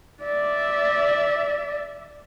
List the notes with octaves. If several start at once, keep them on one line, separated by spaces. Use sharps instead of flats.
D5 E5